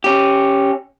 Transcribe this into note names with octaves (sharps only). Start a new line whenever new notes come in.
C#4 G4